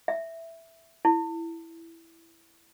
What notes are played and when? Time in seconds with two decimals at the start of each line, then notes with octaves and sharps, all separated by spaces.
0.08 E5
1.05 E4